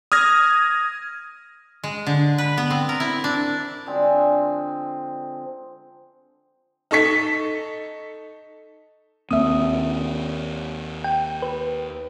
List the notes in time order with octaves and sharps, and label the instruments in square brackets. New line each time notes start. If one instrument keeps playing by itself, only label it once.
[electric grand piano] D#6 F6 G#6 A#6
[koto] G#3
D3
B4
B3
C4
A#4
E4
D4
[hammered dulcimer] D3 F3 G#3 C4
[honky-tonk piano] D#4 A4 C#6 B6
[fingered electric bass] D#2 A#3 C4 [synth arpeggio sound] E5 D#6
[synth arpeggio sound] G5
B4